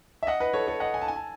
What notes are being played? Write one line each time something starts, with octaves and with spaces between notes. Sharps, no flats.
E5
D#5 F#5
B4 D#5
A4 C#5
A4 C#5
D#5 F#5
G#5
A5
G#5
A5